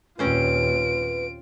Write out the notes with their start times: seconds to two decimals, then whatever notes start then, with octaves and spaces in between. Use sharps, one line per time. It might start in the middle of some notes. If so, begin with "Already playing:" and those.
0.19 D#2 A#2 C4 C#4 F4 B4 C5 D7